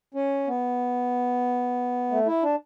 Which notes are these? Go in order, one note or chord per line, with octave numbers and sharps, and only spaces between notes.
C#4
B3
A3
E4
D4